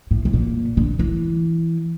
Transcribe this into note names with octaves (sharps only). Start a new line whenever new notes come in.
A2
A2
A#2
D3
E3